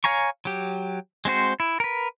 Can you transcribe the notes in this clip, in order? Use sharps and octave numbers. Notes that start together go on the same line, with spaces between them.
C#5 F5 G#5 A#5 C#6
F#3 G4
G#3 C4 F#4 C5
E4
A#4 B4